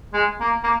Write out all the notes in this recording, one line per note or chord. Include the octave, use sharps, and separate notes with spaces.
G#3
A#3
A#3